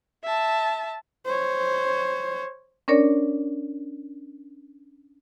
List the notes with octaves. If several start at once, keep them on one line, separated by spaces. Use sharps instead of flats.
E5 A5
C5 C#5
C#4 D4 A#4 C#5 D5